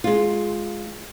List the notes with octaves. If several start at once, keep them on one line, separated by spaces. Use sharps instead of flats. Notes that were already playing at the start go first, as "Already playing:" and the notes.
G#3 F4